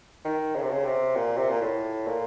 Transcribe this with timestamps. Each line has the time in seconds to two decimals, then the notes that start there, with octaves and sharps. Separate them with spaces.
0.25 D#3
0.56 C#3
0.63 C3
0.70 C#3
0.86 C3
1.16 A#2
1.37 C3
1.50 A#2
1.62 A2
2.07 A#2